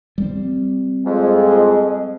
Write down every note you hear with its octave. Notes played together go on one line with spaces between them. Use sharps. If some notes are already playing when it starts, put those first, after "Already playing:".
G3 C4
F2 G#3